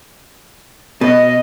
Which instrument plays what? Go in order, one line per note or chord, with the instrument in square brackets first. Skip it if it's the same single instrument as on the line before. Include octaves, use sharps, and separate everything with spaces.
[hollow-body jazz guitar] B2 [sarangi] D#5